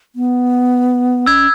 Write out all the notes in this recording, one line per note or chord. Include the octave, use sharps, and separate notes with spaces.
B3
C#4 E6 G#6